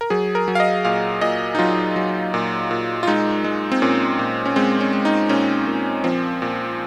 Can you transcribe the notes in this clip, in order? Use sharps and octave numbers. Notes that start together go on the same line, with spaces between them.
A#4
F#3 G#4
A#4
F#3
F5
D#5
A#2 F5
A#2 D#5
D#4
F#3 F4
F#3
A#2
A#2
F4
G#3 D#4
G#3
C4
A#2 C#4
A#2
C#4
G#3 C4
C#4
G#3
D#4
A#2 C#4
A#2
F3 C4
A#2